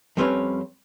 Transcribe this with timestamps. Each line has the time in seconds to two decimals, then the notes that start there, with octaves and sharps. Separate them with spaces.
0.17 F2 G3 C4 C#4 B4 C#5